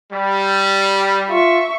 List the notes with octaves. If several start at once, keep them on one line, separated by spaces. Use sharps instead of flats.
G3
F4 E5 C#6